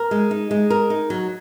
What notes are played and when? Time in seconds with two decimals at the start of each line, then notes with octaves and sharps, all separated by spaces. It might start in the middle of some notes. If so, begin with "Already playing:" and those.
Already playing: A#4
0.11 G#3
0.31 D#4
0.51 G#3
0.70 A#4
0.90 D#4
1.10 F#3